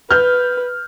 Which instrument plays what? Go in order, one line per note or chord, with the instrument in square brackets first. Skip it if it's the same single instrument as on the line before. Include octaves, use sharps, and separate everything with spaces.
[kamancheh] B4 [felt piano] F6 G6